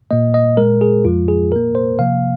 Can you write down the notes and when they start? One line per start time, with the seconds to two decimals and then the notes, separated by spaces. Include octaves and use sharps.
0.11 A#2 A#3 D#5
0.34 D#5
0.57 A#2 G#3 A#4
0.81 G#4
1.05 F2 F3 G#3 F4
1.28 G#4
1.52 A#2 A#3 A#4
1.75 C5
1.99 C3 F3 A#3 F5